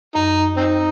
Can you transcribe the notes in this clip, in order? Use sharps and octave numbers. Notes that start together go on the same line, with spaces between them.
F#2 D#4
C4 D#4